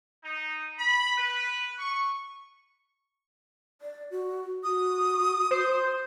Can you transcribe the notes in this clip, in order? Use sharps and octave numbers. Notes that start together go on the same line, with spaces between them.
D#4
B5
B4
C#6
D5
F#4
F#4 D#6
C5